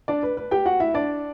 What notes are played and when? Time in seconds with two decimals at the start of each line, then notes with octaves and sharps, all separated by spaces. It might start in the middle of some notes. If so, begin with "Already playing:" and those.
0.08 D4 D5
0.23 B4
0.37 B4
0.51 G4 G5
0.65 F#4 F#5
0.80 E4 E5
0.94 D4 D5